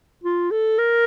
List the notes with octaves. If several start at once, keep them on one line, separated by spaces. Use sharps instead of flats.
F4
A4
A#4